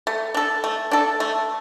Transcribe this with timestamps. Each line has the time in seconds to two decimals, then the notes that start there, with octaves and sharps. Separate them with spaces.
0.07 A3
0.34 D4 A4
0.64 A3
0.91 D4 A4
1.20 A3